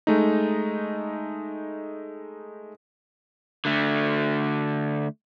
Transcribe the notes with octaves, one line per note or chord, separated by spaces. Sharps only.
G#3 A3 D#4
D3 A3